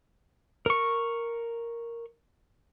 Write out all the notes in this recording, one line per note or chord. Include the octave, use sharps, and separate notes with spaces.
A#4 C#6